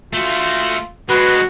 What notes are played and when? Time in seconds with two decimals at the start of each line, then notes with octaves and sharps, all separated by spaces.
0.13 A3 F4 F#4
1.09 D3 G#3 F#4 B4